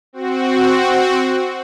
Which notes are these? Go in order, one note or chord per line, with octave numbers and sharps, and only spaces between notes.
C4 F#4